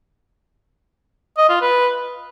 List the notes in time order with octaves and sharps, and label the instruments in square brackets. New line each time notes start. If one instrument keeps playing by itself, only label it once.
[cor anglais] D#5
F4
B4